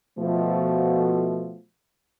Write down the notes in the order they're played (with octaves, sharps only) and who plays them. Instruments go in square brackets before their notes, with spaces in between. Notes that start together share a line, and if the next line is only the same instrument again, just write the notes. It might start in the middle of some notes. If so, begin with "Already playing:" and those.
[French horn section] B2 F3 A3